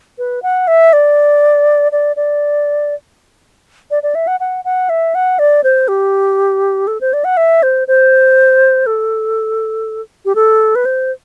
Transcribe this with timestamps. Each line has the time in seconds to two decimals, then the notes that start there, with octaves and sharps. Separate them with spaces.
0.18 B4
0.43 F#5
0.68 E5
0.93 D5
1.92 D5
2.16 D5
3.91 D5
4.03 D5
4.15 E5
4.27 F#5
4.40 F#5
4.65 F#5
4.89 E5
5.15 F#5
5.39 D5
5.64 C5
5.88 G4
6.87 A4
7.01 C5
7.13 D5
7.25 F#5
7.37 E5
7.63 C5
7.88 C5
8.86 A4
10.25 G4
10.35 A4
10.75 B4
10.85 C5